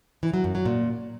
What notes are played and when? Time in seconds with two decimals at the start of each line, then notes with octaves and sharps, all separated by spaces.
0.23 E3
0.34 F#3
0.44 F#2
0.55 F#3
0.65 A#2